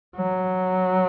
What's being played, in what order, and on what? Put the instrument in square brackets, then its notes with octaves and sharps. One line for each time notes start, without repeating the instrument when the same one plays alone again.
[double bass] F#3